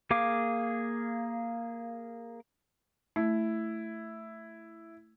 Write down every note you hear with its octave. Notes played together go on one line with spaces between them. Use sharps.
A#3 G#4 F5 D6
A3 E4